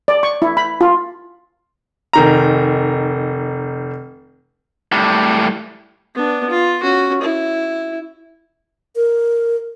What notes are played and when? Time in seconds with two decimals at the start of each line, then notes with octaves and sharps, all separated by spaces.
0.08 D5
0.23 C#6
0.42 E4
0.57 B5
0.81 F4
2.13 F1 D#3 A#5
4.92 A2 G3
6.15 B3 D4
6.50 F4
6.82 C#4 F#4
7.21 E4
8.96 A#4